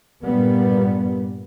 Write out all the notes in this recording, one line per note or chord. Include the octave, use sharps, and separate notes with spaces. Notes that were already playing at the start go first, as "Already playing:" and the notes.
G2 A#2 G3 B3